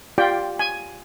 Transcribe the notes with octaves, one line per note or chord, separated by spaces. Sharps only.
F4 G4 D5 G5
G#5